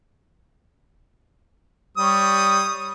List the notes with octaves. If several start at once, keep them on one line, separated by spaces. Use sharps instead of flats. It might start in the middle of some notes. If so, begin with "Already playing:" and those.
G3 C#5 D#6